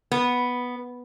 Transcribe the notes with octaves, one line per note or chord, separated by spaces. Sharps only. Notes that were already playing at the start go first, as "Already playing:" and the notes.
B3